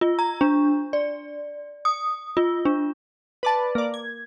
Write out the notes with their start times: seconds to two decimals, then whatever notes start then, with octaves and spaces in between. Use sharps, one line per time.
0.01 F4
0.19 A#5
0.41 D4
0.93 D5
1.85 D#6
2.37 F4
2.65 D4
3.43 B4 D5 A5
3.75 A#3 D5
3.94 G#6